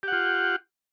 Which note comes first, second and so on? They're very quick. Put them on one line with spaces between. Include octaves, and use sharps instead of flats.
G4 F#5 F4